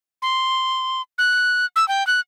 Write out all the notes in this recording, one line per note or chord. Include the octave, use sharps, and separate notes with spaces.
C6
F#6
E6
G5
F#6